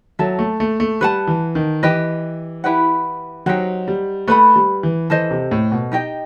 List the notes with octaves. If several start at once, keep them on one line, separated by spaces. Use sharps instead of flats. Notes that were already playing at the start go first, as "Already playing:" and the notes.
F#3 A4 E5 A5
A3
A3
A3
G3 B4 F#5 A5
E3
D#3
E3 G4 B4 D#5
E4 G4 B4 F#5
F#3 D#4 G4 C5 F#5
G3
A3 B4 F#5 B5
G3
E3
E3 A4 C5 D#5
C3
A2
B2
D#4 G4 D#5 G5